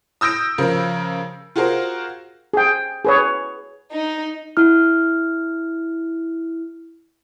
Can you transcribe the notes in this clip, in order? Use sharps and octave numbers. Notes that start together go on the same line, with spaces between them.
D#6 E6 G6 A#6 D7
C#3 F3 A#4
F4 F#4 G#4 A#4 C5
G#4 G5
G#4 B4 C#5
D#4
E4 F6